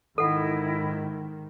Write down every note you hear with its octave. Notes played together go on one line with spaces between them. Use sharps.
G#2 D#3 E4 A4 D#5 F#5